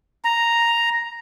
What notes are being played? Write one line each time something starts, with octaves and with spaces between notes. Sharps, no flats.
A#5